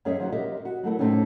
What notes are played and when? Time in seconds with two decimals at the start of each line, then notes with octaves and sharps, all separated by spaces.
0.05 F#2 C#4 G#4 C#5 D#5 E5
0.20 F3 F#3 D#4 F#4
0.32 G4 A#4 D#5 E5
0.65 F#4
0.83 F#3 A3 E4 A#4
0.99 A2 C3 A3 C4 C#4 D#4